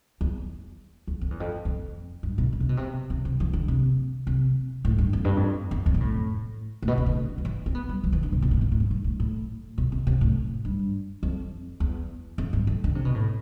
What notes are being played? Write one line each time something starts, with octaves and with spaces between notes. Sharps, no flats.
E2
E2
F2
E2
F2
F2
G2
B2
D3
C3
B2
C3
C3
C3
F3
D3
C3
C3
A2
G2
F2
G2
F2
E2
F2
B2
A2
A2
B2
C3
D3
F3
E3
C4
B3
G3
F3
E3
D3
C3
B2
A2
B2
A2
F2
G2
A2
A2
B2
C3
C3
A2
G2
F2
E2
F2
G2
F2
D3
C3
B2
A2